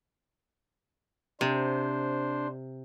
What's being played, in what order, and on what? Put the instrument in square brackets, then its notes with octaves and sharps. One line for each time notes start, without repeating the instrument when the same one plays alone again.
[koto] C3 [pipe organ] D4 C5